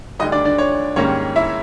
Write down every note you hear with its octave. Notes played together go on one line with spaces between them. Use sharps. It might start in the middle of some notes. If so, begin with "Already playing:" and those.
D2 D3 G3 D#4 D#5
D4 D5
D4 D5
C#5
G#2 D#3 G3 A#3 C#4 C#5
E4 E5